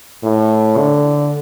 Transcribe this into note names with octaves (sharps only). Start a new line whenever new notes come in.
A2
D3